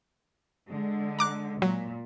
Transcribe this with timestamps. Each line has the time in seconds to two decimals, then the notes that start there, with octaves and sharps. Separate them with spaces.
0.69 D3 G#3
1.19 A#5 D6 F#6
1.62 A#2 F#3